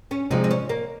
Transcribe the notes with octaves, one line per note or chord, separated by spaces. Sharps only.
C#4
C3 F3 G#3 C4 D#4
D#4
C#4
A#3